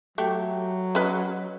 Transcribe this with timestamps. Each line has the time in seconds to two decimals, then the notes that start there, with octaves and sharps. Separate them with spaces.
0.18 F#3 A3 G4
0.95 C#4 B4 D#5